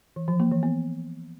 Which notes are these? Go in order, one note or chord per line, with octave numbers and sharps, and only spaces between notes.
E3
F3
A#3
E3
B3